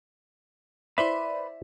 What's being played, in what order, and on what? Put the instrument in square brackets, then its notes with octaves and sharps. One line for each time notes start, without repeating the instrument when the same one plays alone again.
[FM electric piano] E4 C5 D5 [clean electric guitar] B4 B5 C6 [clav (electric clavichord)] E5